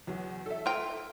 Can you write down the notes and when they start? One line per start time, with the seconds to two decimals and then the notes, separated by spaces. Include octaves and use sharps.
0.07 E2 F#3
0.46 A4 E5
0.66 F4 G5